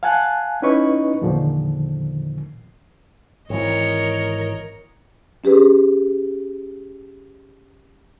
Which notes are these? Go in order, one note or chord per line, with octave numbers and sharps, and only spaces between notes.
F5 F#5 G#5 A5 F#6
C#4 D#4 E4 B4 D#5 C#6
E2 A#2 D3 D#3 F3
G#1 E3 A#4 C#5 D#5
C#4 G4 G#4 B4